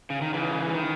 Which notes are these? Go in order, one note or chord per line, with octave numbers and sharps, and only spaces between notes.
C#3
D#3
C#3 E3
C#3
D#3